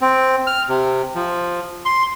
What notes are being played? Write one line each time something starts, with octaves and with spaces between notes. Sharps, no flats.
C4
F6
C3
F3
C6